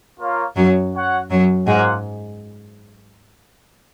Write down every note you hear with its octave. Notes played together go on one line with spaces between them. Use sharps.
A#3 F4 A#4 C#5 F5
F#2 F#3
F#4 C#5 F#5
F#2 F#3
G#2 G#3 A#3 F4 C5 F#5